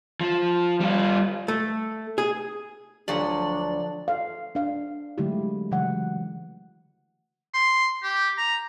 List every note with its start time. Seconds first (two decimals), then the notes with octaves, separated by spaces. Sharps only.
0.21 F3
0.80 G3 F4
1.48 A3
2.18 G#4
3.08 D2 F3 F#3 D4 D5
4.08 A4 F5
4.55 D4 F5
5.18 D3 F#3 G#3 A3 E4 G4
5.72 C#3 E3 F#3 G#3 F#5
7.54 C6
8.03 G4
8.37 A#5